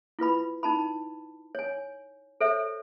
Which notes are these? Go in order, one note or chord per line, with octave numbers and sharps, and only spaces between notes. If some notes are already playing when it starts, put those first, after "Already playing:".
E4 F4 B4 B5
D#4 A5 B5
C#5 G#5
A4 C5 C#5 E5